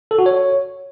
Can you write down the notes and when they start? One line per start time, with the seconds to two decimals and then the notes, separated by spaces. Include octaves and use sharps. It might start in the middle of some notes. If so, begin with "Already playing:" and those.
0.11 A4
0.18 F#4
0.26 C#5